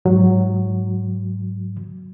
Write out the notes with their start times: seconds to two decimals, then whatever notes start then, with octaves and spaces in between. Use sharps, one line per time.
0.05 G#2 F#3